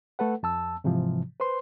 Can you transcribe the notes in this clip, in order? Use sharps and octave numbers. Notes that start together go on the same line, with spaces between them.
A3 A4 B4 F#5
F2 A5 E6
G#2 C3 E3 F3
B4 C5 C6